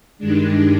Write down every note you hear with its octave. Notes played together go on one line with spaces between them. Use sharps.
G2 D#3 G#3 D4